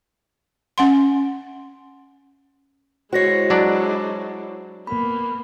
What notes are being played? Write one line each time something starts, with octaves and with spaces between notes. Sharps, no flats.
C#4 F#5 C6
G#3 E4 F#4 C5 C#5 A#6 C7
F#3 D4 D5
A#3 B3 B5